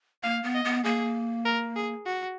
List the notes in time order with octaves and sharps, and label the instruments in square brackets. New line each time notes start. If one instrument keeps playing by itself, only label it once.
[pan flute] A#3 [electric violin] F5
[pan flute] B3
[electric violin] D#5
[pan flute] B3
[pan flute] A#3 [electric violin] G#4
[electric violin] A#4
G#4
F#4